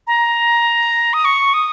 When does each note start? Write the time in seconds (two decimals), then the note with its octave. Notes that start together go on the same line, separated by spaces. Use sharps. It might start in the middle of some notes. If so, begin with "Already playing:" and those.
0.07 A#5
1.14 D#6
1.25 C#6
1.54 D#6